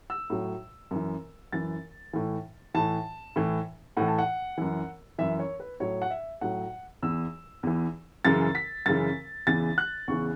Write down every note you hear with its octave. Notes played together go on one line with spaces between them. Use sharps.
E6
A2 F#3
F#2 E3
F#2 E3 A6
A2 E3
A2 E3 A5
A2 E3
A2 E3 F#5
A5
F#5
F#2 E3
F#2 E3 E5
C#5
B4
A2 F#3 C#5
F#5
E5
A2 F#3 F#5
E2 E3 E6
E2 E3
F#2 C#3 E3 A6
B6
F#2 C#3 E3 A6
E2 C#3 E3 A6
F#6
E2 C#3 E3 C#6